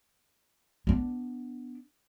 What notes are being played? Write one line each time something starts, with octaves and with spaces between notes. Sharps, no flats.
B3 D4